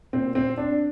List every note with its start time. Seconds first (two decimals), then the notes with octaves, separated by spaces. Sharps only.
0.13 A#2 C4
0.35 C4
0.58 D4